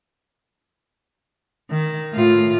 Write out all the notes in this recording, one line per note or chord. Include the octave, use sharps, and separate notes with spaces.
D#3
A2 F4